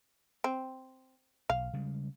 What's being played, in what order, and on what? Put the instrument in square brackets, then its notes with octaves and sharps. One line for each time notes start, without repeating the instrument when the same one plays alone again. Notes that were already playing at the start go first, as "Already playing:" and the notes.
[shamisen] C4
[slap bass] B1 [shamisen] F5
[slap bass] C#3 G3 G#3